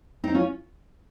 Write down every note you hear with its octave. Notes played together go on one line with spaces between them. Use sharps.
C4 D#4
C#4 F4